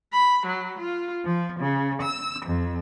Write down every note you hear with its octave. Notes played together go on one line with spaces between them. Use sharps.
B5
F#3
F4
F3
C#3
E6
F2